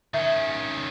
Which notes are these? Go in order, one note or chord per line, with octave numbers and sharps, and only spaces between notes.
D#3 C#4 E5